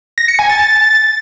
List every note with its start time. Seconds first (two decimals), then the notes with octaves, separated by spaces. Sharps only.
0.18 A#6
0.28 C#7
0.39 G#5
0.49 A6